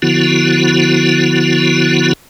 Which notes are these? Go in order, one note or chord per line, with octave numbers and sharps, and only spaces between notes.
D3 F3 B3 E4 F#4